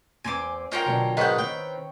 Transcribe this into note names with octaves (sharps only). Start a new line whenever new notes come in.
E2 C4 G#5 C6 D6
C#4 F4 A#4 C5 D#5 G5 A#5
B2 D3 F#3
G#2 D#3 B4 C#5 G6
D#3 C4 G5